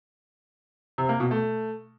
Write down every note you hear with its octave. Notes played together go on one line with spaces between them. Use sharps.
C3
A#3
B2
A3